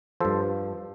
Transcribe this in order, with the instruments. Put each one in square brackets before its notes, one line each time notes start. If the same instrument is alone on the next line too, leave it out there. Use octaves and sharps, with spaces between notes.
[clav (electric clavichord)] G2 F3 A4 C5